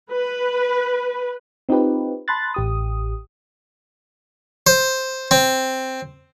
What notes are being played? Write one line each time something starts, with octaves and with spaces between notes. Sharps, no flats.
B4
C4 D#4 F4 G4 B4
A5 B5 C6 F#6 A6
A1 G4 D#6
C5
C4